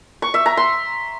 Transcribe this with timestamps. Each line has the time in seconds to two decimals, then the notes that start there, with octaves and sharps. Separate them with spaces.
0.22 C#6
0.34 E5
0.46 A#5
0.57 C6